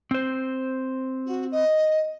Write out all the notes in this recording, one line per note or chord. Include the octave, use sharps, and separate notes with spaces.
C4 C5
F#4
D#5